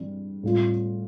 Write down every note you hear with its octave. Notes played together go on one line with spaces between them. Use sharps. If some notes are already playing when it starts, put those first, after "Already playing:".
Already playing: G2 E3 G3 C4
A2 G3 C4 F4